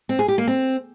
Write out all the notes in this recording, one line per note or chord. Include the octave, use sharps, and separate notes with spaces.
C4
G#4
G4
A#3
C4